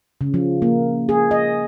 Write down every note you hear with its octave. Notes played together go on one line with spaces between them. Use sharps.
C#3
F3
A#3
G#4
D#5